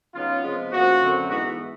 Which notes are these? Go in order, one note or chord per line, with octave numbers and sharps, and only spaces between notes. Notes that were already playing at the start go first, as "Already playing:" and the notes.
C#3 F#3 B3 D#4 F4
C3 F3 G#3 B3
C#3 F3 A#3 F#4
F#2 D3 F#3 A3 C4
G#2 E3 G#3 B3 F#4